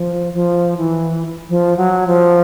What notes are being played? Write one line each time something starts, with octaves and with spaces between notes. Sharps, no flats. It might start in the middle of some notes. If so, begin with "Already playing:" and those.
Already playing: F3
F3
E3
F3
F#3
F3